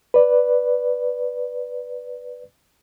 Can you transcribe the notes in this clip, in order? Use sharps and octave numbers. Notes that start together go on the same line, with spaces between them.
B4 D5